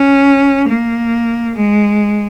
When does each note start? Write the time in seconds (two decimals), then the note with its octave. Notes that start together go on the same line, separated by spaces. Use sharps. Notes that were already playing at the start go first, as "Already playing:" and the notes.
Already playing: C#4
0.69 A#3
1.56 G#3